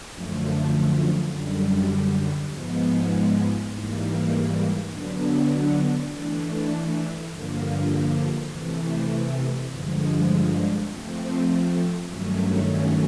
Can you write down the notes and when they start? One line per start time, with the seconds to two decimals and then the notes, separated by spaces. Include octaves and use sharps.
0.12 F#2 D3 F3 A3
1.32 F#2 D3 G3
2.51 G#2 F3 G#3 B3
3.71 G#2 E3 G3 A#3
4.90 D3 F#3 B3 D4
6.10 E3 A3 D4
7.30 G2 D3 F3 A#3
8.49 C3 E3 A3
9.68 G2 D3 F3 G#3
10.88 F3 A3 C4
12.07 G2 D#3 F#3 A3 C#4